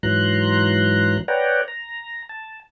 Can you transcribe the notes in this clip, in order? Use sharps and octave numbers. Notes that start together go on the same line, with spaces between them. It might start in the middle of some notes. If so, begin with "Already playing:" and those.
G#2 E3 F#3 A#5 C6 F#6
B4 C#5 D5 F#5 G5 A#5
A#5
A5